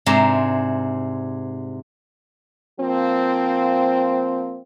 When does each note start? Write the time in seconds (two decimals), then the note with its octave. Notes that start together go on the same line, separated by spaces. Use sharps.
0.06 G#2 C3 D4 E5 A#5 C6
2.79 F3 A#3 C4